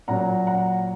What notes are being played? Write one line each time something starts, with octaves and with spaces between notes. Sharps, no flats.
A#2 F#3 F#5 A#5
F#5 A#5